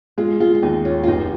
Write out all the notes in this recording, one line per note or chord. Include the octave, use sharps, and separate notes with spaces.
G#3 F4
G#3 F4
F4
D#2 D#4
C#4 F4
F4
F1 D#4